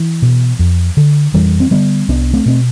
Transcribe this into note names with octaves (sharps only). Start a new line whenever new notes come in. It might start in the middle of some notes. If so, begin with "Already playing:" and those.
Already playing: E3
B2
F2
D3
F2 E3 G3
C4
D3 G3 B3
C2 B3 D4
A3 C4
B2 C4